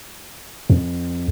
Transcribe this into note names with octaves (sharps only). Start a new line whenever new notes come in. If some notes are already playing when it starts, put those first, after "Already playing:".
F2